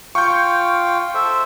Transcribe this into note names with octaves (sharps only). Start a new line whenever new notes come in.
F4 F5 G5 C#6 G6
A4 C5 E5